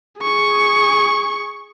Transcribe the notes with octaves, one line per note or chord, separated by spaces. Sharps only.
G#4 C#6